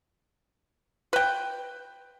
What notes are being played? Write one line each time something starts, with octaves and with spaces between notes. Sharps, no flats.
B4 G5